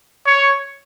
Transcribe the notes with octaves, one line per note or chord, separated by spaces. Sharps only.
C#5